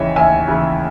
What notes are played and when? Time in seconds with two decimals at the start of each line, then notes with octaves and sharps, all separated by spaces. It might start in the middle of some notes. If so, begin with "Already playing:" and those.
Already playing: D#2 C#3 E3 C#5 D#5 E5
0.16 D#2 E5 G#5
0.48 C#3 E3